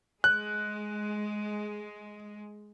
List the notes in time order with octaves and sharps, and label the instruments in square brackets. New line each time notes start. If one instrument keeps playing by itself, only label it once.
[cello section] G#3 [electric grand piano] F#6